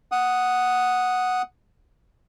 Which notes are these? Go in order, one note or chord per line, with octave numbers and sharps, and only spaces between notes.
F#5 D#6